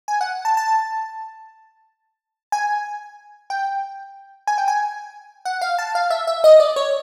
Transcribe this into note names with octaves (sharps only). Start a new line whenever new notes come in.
G#5
F#5
A5
A5
G#5
G5
G#5
G5
G#5
F#5
F5
A5
F5
E5
E5
D#5
D5
C#5